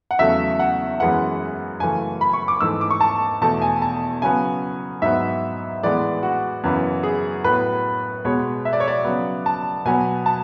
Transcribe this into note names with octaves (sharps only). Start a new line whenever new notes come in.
F#5
E2 C#3 F#3 A3 E5
F#5
F#2 E3 G#3 B3 F#5
F#2 C#3 E3 A3 G#5
B5
C#6
D6
G#2 E3 A3 E6
D6
C#6
A5
E2 B2 A3 A5
G#5
A5
C#3 F#3 B3 G#5
G#2 F#3 B3 E5
A2 E3 G#3 B3 D5
F#4
F#2 C#3 E3 B3
G#4
A2 F#3 B3 B4
B2 G#3 B3 C#5
E5
D5
C#5
D5
C#3 F#3 B3
A5
B2 F#3 B3 G#5
A5